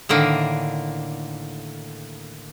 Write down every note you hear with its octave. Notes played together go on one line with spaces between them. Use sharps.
A2 D3 D#3 A#3